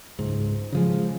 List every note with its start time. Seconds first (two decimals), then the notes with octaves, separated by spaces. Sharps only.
0.19 C#2 G#2
0.72 C#3 F3 G#3